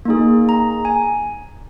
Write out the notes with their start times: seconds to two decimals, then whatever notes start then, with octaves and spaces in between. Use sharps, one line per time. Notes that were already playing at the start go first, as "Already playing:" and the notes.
0.05 A#3 D#4 G#4
0.49 A#5
0.85 G#5